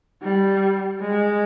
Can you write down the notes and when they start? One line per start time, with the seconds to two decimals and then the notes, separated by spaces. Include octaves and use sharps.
0.22 G3
1.02 G#3